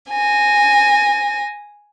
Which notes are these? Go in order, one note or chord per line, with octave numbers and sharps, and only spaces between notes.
G#5 A#6